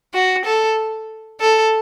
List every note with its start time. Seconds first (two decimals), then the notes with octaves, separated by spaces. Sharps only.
0.14 F#4
0.45 A4
1.40 A4